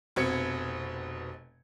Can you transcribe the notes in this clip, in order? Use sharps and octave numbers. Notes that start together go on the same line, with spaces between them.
F1 B2 C4 G#6 C#7